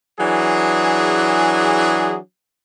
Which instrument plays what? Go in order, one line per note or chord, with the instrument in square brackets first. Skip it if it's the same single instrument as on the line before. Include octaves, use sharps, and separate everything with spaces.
[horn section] E3 F#3 D4 G#4